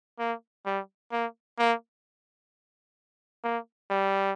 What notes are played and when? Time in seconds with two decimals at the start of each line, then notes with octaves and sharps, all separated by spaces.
0.19 A#3
0.66 G3
1.12 A#3
1.59 A#3
3.44 A#3
3.90 G3